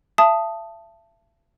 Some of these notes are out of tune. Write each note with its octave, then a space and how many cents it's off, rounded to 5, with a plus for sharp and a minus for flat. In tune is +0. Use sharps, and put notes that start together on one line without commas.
E5 +40 A5 +0 D#6 +0